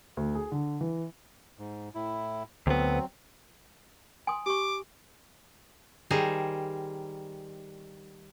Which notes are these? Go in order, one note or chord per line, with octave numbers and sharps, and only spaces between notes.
D2
G#4
D3
E3
G#2
A2 E4
D2 F#3 B3 C4
G#5 C6 D#6
G4 C#6 D6
D#3 G3 G#4 A#4 C5